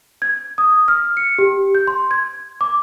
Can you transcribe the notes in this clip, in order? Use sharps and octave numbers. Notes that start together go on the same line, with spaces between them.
G#6
D#6
F6
C#7
G4
G6
C6
G#6
D6